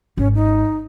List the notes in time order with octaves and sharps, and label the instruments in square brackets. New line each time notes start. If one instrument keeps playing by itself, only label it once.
[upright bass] G#1 [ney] C#4
[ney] D#4